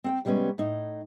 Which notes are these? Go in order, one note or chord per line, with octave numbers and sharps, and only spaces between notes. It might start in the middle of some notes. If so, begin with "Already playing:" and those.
C4 F#5 G5
C3 G3 G#3 B3 C#4
A2 D#4